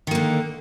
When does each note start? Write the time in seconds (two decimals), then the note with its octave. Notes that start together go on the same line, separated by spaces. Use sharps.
0.07 D#3
0.11 A#3
0.15 D3